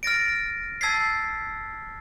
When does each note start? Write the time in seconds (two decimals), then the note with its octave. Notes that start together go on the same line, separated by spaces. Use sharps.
0.03 F6 A6 A#6 D7
0.81 A5 E6 G#6 A6 B6 C7